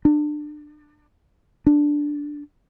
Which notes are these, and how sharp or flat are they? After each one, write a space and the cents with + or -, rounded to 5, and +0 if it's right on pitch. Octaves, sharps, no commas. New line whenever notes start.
D4 +25
D4 -5